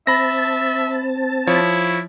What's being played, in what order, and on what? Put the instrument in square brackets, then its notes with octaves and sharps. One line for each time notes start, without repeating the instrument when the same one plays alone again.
[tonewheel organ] C4 A5 [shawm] E5 [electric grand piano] B5 A#6
[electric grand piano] F3 C#5 [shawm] E4